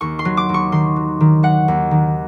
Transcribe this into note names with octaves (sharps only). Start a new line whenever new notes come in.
D#2 C#6
C6
F#3
D6
D#2
C#6
D#3 C6
F#3
D#3
F#3 F#5
D#2
D#3